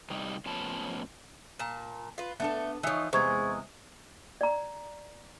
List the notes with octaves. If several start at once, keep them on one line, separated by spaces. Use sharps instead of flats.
C3 G3 D#4
A2 F3 B3 C#4 A5
A#2 A5
F4 B4
A3 B3 D4 A4
E3 F3 D#4 C#5
E2 C3 G#3 B3 C5 C#6 G#6
D5 A#5